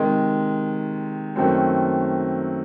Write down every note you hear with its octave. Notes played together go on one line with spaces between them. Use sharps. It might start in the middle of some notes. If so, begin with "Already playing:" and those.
Already playing: C3 D#3 G#3
F#2 D#3 F#3 A3 C4